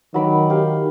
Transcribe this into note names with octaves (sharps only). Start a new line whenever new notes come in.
D#3 F#3 B5 D6
G4 F5 G5